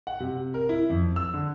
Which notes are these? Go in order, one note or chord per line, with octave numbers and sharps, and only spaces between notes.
F#5
C3
A#4
E4
F2
E6
D3